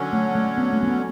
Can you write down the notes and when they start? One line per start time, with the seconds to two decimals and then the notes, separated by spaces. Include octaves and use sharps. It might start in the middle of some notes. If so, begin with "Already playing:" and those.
Already playing: D3 F#3 C#4
0.13 A3
0.35 A3
0.58 B3
0.73 A3
0.83 A3
0.87 B3